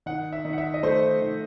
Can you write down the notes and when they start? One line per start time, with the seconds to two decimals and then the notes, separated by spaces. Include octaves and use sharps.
0.06 D#3 F#5
0.33 E5
0.45 D#3
0.53 F#5
0.58 E5
0.74 D#5
0.83 A3 C5
1.22 D#3